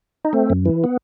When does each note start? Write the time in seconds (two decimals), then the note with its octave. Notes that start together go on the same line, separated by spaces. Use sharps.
0.25 D#4
0.33 A3 C4
0.50 F#2
0.65 E3
0.84 B3